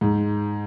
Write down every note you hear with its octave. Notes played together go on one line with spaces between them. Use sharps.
G#2